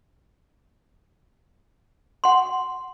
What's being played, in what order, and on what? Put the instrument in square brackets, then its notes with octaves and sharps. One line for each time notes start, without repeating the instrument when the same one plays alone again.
[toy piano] F#5 C6